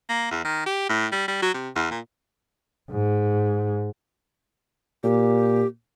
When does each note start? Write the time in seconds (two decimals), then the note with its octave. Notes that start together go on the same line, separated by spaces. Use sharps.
0.09 A#3
0.31 E2
0.44 D#3
0.66 G4
0.89 A2
1.12 G3
1.28 G3
1.42 F#3
1.54 C3
1.76 E2
1.91 A#2
2.91 G#2
5.04 A#2 G4